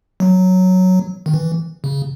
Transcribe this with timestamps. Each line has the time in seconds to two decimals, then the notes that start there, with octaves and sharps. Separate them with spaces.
0.20 F#3
1.26 D#3
1.34 E3
1.84 C#3